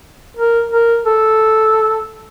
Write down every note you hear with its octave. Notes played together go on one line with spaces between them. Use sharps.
A#4
A#4
A4